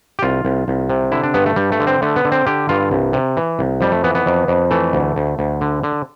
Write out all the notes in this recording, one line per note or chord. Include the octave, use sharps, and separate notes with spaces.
G4
C2 F4
C2
C2
C3
D3 E4
D4
G2 B3
A3
G2 G3
A3
D3
C4
D3 A3
B3
D3
C4
D3 G4
G2 F4
C2
C3
E3
C2
F2 G3
A3
E3 B3
B3
F2
F2
E3 A3
D2
D2
D2
D3
D3